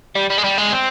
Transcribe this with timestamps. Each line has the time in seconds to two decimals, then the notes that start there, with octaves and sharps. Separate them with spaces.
0.15 G3
0.30 G3
0.38 G#3
0.44 G3
0.58 G#3
0.72 C4